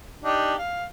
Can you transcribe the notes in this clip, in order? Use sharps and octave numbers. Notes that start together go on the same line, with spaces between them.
D4 D#4 G4
F5